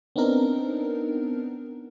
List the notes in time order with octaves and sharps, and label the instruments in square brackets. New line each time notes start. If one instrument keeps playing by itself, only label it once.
[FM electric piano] B3 C4 D4 D#4 A#4